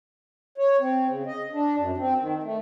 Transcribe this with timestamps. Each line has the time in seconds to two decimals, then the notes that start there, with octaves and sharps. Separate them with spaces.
0.58 C#5
0.80 C4
1.08 C#3
1.26 D#5
1.52 D4
1.77 F#2
1.97 C4
2.19 D#3
2.43 A3